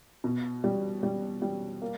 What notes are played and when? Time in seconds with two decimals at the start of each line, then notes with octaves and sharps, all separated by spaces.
0.24 B2
0.64 G3
1.03 G3
1.42 G3
1.82 A#3